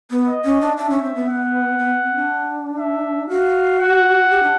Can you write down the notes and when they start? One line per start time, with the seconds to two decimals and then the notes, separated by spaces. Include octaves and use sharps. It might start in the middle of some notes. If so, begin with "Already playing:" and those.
0.11 B3
0.28 D#5
0.44 C#4
0.61 D4
0.77 D4 E5
0.90 C#4
1.03 C4
1.15 B3
1.28 F#5
1.79 B3
2.03 C4
2.16 D4
2.79 E5
3.29 F#4 F5
3.79 F#5
4.30 G4
4.43 D4